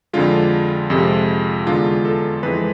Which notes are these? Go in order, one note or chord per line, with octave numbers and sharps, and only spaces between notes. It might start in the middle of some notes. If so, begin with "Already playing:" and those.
F2 D3 G#3 F4
F2 C3 G#3
E2 D3 G#3 F4
A4
F2 E3 G#3 B4